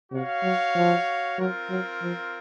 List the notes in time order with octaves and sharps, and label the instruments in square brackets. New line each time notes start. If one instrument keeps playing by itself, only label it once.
[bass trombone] C3 [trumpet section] F#4 C#5 F5
[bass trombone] F#3
F3
[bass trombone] F#3 [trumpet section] C4 F4 A#4
[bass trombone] F#3
F3